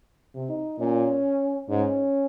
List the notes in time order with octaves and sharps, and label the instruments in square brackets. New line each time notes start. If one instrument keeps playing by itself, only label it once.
[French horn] C3
[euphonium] D#4
[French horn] A#2 [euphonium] C#4
[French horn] G#2 [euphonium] C#4